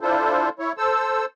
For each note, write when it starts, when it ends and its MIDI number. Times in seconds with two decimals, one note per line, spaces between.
0.01 0.49 62
0.01 0.49 64
0.01 0.49 65
0.01 0.49 69
0.01 0.49 72
0.59 0.72 64
0.59 0.72 73
0.78 1.25 69
0.78 1.25 72
0.78 1.25 88